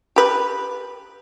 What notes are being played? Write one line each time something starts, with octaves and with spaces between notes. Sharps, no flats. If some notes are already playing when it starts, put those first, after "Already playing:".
G4 B4